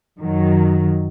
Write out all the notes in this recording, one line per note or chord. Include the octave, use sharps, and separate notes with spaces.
F#2 D#3 F#3